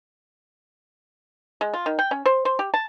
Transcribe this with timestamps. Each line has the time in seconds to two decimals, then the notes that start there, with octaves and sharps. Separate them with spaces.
1.61 G#3
1.74 F4
1.86 D#3
1.99 G5
2.11 C#4
2.26 C5
2.45 C5
2.59 G4
2.74 A5